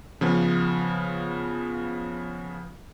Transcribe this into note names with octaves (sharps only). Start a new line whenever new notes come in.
C#3 F3 B3